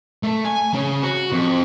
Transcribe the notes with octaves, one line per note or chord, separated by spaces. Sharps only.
A3
G#5
C#3
F#4
F2